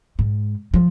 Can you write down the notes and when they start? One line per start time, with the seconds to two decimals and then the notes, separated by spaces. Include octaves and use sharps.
0.19 G#2
0.74 F3